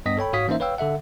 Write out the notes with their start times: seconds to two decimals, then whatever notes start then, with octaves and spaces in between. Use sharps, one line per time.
0.06 G2 B3 D#5 D#6 A#6 B6
0.17 A4 C#5 G5 B5
0.33 G#2 F#4 C#5 F5 D#6 B6
0.48 E3 A#3 C#4 D#4 C5 E5
0.60 B4 C#5 F5 G5 E6
0.78 D3 A4 E5 F#5